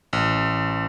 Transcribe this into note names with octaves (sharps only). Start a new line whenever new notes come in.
A1